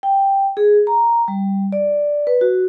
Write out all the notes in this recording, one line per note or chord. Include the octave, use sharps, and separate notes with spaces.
G5
G#4
A#5
G3
D5
B4
F#4